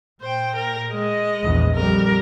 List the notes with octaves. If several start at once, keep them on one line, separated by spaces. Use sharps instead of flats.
A#2 C5 G5
A#4
G#3 D#5
A#1 E2 A#2
F2 G3 A#4